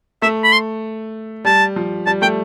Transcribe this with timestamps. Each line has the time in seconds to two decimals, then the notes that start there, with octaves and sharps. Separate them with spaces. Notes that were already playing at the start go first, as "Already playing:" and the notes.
0.22 A3 E5
0.44 B5
0.53 C6
1.45 G3 A5
1.76 F3
2.06 G3 A5
2.22 A3 G5